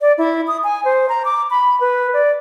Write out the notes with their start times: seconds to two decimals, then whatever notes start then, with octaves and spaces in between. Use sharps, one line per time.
0.01 D5
0.18 E4
0.47 D#6
0.64 G#5
0.85 C5
1.09 A#5
1.25 D6
1.50 B5
1.81 B4
2.14 D5